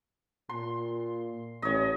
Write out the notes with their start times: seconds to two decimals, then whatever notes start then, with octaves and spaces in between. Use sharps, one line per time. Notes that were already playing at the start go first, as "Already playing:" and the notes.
0.49 A#2 C6
1.62 A1 C#5 D#5